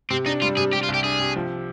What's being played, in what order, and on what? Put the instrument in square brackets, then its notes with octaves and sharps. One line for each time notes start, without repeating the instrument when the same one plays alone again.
[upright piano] C3 [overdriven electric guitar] C4
[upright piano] D4 [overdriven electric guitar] D#4
[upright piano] G3 [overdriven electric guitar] F4
[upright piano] C3 [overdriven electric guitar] G#4
[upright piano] G3 [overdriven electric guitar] G4
[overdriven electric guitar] F4
[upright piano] C2
[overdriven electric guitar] G4
[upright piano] D4 [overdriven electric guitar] G#4
[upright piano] C3
F3